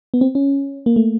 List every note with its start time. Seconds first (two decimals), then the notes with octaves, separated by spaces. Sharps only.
0.14 B3
0.21 C4
0.35 C#4
0.86 A#3
0.96 A3